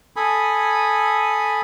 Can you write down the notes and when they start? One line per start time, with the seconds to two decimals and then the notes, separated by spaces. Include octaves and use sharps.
0.16 A4 G#5 B5 D#6